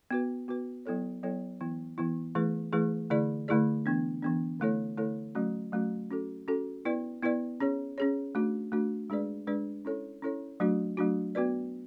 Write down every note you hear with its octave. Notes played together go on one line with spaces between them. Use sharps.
B3 F#4 B4
B3 F#4 B4
F#3 B3 E4 A4 C#5
F#3 B3 E4 A4 C#5
E3 B3 E4
E3 B3 E4
E3 A3 E4 G#4 B4
E3 A3 E4 G#4 B4
D3 A3 E4 G#4 D5
D3 A3 E4 G#4 D5
E3 B3 D4
E3 B3 D4
D3 A3 E4 A4 C#5
D3 A3 E4 A4 C#5
F#3 A3 C#4 F#4
F#3 A3 C#4 F#4
C#4 F#4 A4
C#4 F#4 A4
B3 E4 B4 D5
B3 E4 B4 D5
C#4 G#4 C#5
C#4 G#4 C#5
A3 D4 F#4
A3 D4 F#4
G#3 D4 G#4 B4 D5
G#3 D4 G#4 B4 D5
C#4 E4 A4 C#5
C#4 E4 A4 C#5
F#3 A3 D4 F#4
F#3 A3 D4 F#4
B3 F#4 B4 D5